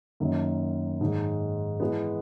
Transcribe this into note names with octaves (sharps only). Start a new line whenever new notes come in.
F#2 D#3 F#3 A#3
G#2 D#3 G#3
E3 G#3 B3